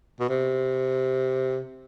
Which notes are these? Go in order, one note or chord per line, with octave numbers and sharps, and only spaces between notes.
B2
C3